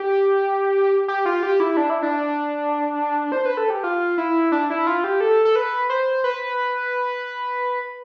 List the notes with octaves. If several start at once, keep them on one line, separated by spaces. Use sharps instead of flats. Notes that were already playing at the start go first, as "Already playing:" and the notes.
Already playing: G4
G4
F4
G4
E4
D4
E4
D4
C5
B4
A4
G4
F4
E4
D4
E4
F4
G4
A4
A4
B4
C5
B4